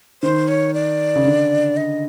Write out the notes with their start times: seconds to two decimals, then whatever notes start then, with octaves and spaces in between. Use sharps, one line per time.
0.23 D#3 C5
0.48 C#5
0.74 D5
1.15 C#3
1.25 D3
1.77 D#5